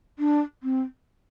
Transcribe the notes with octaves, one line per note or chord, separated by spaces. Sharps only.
D4
C4